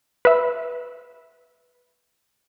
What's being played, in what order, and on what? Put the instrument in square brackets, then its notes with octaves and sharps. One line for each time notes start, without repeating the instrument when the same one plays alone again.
[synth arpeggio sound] B4 E5